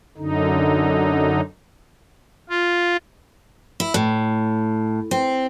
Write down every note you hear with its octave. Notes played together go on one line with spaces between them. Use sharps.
F#2 D3 D#4
F4
E4
A2
C4